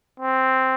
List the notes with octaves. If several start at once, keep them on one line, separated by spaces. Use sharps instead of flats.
C4